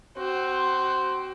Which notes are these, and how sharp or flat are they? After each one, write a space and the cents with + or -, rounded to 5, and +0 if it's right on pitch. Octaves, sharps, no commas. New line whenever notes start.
C4 +0 F#4 +30